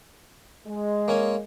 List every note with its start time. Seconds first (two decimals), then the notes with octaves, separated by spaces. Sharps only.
0.67 G#3
1.08 A#3 C#4 G#5